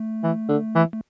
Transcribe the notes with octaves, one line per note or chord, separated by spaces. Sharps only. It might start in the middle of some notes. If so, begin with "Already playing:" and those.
Already playing: A3
E3
D3
E3
A3